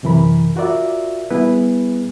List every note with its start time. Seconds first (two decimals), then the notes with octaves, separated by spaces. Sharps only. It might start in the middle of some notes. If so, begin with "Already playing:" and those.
0.03 F#2 C3 E3 A#4 B5
0.56 F4 F#4 A#4 D5 E5
1.30 G3 B3 E4 G#4 B4